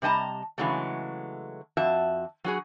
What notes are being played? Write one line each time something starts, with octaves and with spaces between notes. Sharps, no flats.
C3 G3 D#5 A5 A#5
C#3 E3 F#3 G#3 A3
F2 F#4 E5 A5
F#3 F#4 G#4